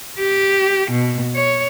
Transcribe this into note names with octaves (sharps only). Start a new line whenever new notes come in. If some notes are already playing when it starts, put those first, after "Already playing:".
G4
B2
C#5